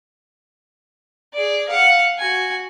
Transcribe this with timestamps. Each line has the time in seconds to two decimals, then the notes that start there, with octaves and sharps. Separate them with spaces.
1.34 G#4 D5
1.69 F5 F#5
2.19 F#4 G#5